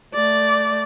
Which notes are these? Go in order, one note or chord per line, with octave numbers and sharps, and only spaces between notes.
A3 D5